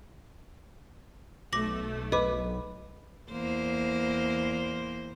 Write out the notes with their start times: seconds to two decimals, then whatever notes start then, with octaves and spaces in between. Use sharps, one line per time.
1.53 B1 A3 D6 A#6 F#7
2.12 B4 D#5 D6
3.32 E2 A#3 C5